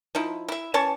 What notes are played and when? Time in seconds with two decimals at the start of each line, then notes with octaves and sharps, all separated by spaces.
0.15 F3 D#4 E4
0.48 E4 E5
0.74 E3 C#4 A5 C#6